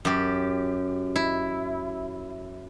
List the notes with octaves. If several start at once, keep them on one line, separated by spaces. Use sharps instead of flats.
F#2 G4
E4